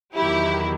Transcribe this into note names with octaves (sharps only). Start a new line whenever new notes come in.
E2 D#3 F#3 E4 G4